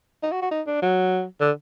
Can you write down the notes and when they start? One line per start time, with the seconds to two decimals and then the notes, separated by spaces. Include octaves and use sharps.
0.23 D#4
0.32 F#4
0.42 F#4
0.51 D#4
0.67 D4
0.82 F#3
1.40 D3